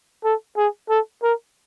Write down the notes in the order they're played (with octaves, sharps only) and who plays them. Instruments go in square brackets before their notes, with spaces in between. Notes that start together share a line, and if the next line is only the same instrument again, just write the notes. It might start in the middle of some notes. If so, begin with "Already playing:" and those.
[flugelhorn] A4
G#4
A4
A#4